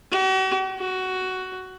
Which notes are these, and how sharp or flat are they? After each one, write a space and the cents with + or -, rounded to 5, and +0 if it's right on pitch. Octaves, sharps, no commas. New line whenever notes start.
F#4 +45
F#4 +10